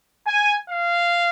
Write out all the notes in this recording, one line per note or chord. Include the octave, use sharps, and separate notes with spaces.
G#5
F5